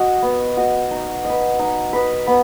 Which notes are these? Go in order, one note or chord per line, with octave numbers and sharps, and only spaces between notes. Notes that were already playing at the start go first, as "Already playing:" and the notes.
Already playing: F#4 D#5
B3
F#4 D#5
D#4
D#5
B4
D#4
B4 D#5
B3